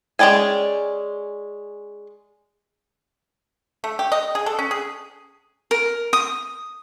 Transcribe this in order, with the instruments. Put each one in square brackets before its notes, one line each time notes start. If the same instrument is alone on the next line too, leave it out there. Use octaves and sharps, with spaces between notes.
[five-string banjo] G#3 C#4 D5 G5 G#5
[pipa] A3
G4
D#5
G#4
A4
C#4
G#4
[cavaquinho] A#4
D#6